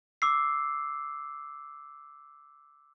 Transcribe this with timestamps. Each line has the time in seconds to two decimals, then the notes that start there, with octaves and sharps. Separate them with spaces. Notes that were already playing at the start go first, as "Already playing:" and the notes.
0.22 D6 E6 C7